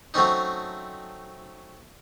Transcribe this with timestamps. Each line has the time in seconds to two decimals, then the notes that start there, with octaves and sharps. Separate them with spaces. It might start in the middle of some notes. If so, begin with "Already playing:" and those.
0.14 F#3 A3 C4 C#4 D#4